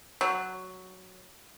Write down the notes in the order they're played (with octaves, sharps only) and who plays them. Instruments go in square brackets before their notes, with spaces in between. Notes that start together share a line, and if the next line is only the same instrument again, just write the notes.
[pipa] F#3